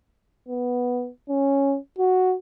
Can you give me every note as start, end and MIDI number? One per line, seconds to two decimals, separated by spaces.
0.48 1.09 59
1.29 1.77 61
1.98 2.35 66